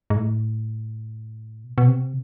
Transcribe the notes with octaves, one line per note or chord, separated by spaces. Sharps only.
G#2
A2
B2
B2
C3